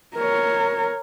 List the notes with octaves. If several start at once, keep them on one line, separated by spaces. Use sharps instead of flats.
A#4 C#5